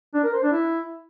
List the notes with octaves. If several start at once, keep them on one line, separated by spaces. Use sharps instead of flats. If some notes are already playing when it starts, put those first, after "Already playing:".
D4
A#4
C5
D4
E4